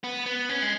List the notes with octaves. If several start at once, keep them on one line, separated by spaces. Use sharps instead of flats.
B3
B3
C#4
G#3